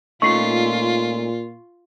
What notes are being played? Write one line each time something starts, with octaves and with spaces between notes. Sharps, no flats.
A#2 A3 C#4 D#4 F4 C#6 C7